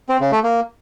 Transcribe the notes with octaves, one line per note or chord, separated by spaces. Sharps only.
C4
C#3
A3
A#3